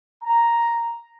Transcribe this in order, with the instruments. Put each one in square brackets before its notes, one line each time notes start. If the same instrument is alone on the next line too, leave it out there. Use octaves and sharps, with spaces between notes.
[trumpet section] A#5